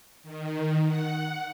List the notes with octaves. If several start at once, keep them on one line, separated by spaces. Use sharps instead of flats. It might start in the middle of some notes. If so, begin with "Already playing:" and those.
D#3
F#5